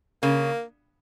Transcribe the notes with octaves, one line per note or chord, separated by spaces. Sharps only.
C#3 A#3